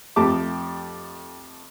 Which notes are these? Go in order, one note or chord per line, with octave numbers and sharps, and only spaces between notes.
F2 A3 G4 A5 D6